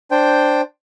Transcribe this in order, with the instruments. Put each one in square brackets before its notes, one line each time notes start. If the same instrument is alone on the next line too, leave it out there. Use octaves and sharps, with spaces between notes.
[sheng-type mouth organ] D4 C5 G5